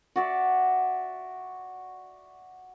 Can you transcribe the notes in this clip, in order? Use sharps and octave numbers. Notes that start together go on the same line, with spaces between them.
F#4 D5 E5